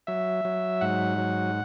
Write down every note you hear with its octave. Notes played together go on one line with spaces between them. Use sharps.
F#3 E5
F#3
G#2 F#5
F#3